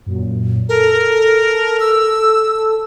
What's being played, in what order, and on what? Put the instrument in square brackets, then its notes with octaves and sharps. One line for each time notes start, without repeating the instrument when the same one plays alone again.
[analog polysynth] F#2 A#2
[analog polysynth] A4 [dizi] A#4
[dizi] E6